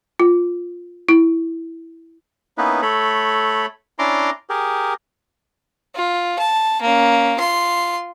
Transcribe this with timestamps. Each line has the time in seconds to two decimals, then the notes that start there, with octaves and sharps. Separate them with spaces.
0.19 F4
1.09 E4
2.58 A#3 B3 C#4 D#4 E4 B4
2.82 A3 A4 C#5 B5
3.99 C#4 D4 E4 A#5 C6 D6
4.50 G4 G#4 A#4
5.95 F4
6.39 A5
6.81 A#3 C#4
7.38 F4 C6